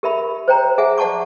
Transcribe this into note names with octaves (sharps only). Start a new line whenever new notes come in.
G4 A#4 E5 B5
C5 C#5 G5 A#5
G#4 E5 F#5 G#5
D5 F#5 A5 C#6 D6